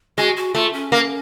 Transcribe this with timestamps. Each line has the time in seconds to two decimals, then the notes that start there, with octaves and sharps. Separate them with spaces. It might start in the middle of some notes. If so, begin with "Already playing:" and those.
0.18 G#3 F#4
0.37 F#4
0.54 A3 F4
0.73 C#4
0.92 A#3